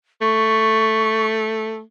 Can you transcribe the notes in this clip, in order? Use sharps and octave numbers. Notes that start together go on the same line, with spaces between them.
A3 C#6